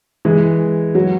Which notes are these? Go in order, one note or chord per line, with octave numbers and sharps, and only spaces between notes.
E3 G#3
F#3